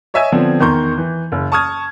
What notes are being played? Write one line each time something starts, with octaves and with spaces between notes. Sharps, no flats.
C#5 D#5 E5 G#5 E6 G#6
D3 F3 B3 C4
E2 D#3 A#4 C6 C#6 G6
E3
F#1
A5 C#6 D#6 F6 G#6